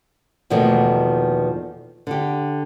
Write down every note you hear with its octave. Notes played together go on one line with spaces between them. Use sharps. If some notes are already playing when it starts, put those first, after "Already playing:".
E2 B2 D#3 F3 A3 A#3
D3 G4